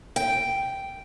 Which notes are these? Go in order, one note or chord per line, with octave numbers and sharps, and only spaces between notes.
G5